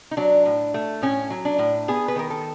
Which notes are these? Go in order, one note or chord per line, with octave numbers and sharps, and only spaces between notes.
D#4
F#3 D4
A2
A3
A2 C#4
F#3
D4
A2
B3 G#4
B4
D#3 A#4
A4